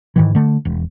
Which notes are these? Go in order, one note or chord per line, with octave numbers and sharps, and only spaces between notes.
G#2 D#3 E3
D3 A3
E1